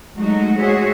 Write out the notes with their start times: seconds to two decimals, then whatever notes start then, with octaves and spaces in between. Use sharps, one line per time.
0.16 F#3 G#3 A3 D#4 F#4
0.60 G#3 F#4 G#4 C5 C#5 E5